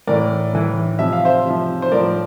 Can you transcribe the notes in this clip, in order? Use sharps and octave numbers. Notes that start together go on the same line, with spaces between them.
A2 E3 A#4 D5
A2 E3
C3 F3 E5
F5
C5 E5
C3 F3
C5
A2 F3 A#4 D5